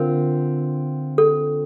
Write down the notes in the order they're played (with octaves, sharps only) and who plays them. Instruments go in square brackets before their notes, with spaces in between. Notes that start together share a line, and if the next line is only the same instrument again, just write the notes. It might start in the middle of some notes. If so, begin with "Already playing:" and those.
Already playing: [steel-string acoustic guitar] D3 C4 F4 [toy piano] A#4
[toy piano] A4